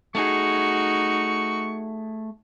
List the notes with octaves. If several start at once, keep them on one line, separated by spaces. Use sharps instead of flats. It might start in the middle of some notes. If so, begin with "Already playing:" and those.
A3 D#4 F#4 G#4 C#6